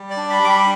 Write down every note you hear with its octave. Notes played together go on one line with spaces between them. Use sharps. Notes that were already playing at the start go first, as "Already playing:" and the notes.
Already playing: G3
D5
D4
B5
G3 D6
B5